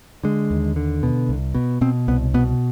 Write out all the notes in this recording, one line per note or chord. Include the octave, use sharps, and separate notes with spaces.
D3 G#3
D#2
D3
B2
C2
B2
B2 C4
C2 B3
B2 B3